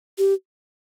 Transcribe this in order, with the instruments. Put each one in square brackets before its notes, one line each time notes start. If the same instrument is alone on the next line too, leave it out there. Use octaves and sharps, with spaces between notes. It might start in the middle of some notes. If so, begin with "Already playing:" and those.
[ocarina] G4